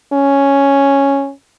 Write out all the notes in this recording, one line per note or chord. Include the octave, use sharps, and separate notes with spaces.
C#4